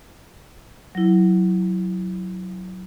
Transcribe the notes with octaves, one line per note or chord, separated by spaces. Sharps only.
F#3 E4